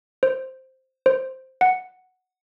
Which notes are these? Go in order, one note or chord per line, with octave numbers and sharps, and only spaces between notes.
C5
C5
F#5